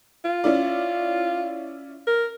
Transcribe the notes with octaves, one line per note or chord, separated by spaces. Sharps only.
F4
C#4 E4 D5
A#4